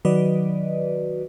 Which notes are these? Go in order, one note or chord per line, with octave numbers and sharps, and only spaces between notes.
D#3 F#3 F#4 B4 D5 D#5